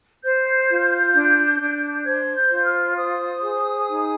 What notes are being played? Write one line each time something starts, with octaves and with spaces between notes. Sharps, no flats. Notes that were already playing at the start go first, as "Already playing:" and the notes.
C5 G6
F4
D4
D4
C5 G#6
G6
F4 G6
F6
C5 D#6
G#4
D#4